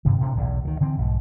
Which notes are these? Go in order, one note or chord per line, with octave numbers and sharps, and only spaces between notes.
G2 C3 D#3
A2 C3 D4
B1 E2
D2 D3 D#3
D3 E3 C4
B1 G#2 F3